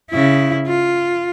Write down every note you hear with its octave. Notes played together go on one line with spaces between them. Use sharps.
C#3 E4
F4